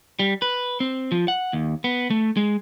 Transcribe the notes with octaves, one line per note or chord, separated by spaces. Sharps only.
G3
B4
C4
F3
F#5
D#2
B3
A3
G#3